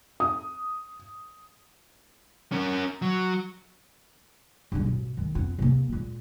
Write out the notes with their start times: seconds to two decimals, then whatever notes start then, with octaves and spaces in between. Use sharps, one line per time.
0.20 D#6
2.52 C#4 A#4
3.02 F#3
4.72 C#2 G2
4.84 A1 B2
5.17 D#3 G#3
5.35 F2 B3
5.59 C3 A#3
5.89 A#2 G#3